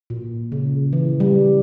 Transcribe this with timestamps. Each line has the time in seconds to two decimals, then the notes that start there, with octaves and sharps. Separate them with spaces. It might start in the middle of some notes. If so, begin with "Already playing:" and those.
0.10 A#2
0.52 C#3
0.93 E3
1.20 G3